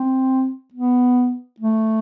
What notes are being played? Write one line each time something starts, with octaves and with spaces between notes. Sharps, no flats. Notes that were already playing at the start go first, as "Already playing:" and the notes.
Already playing: C4
B3
A3